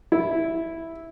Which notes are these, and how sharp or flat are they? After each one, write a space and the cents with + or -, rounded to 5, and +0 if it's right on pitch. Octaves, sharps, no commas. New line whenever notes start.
E4 -5